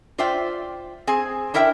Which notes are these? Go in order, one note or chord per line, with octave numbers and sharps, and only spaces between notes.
F4 C5 D5 E5 G5
C4 G#4 G#5
D4 E4 A#4 E5 F5 G5